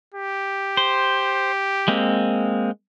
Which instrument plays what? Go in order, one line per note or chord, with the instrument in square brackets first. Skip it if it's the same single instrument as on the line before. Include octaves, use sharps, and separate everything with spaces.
[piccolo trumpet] G4
[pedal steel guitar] C5
G#3 A#3 C4